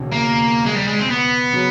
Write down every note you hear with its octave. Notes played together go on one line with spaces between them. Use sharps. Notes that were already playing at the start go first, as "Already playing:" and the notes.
Already playing: E1 D#2 C#3
A#3
G#3
G3
G#3
C4
B3
C#3 F#3